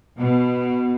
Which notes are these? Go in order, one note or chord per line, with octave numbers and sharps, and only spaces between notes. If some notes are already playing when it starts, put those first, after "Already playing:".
B2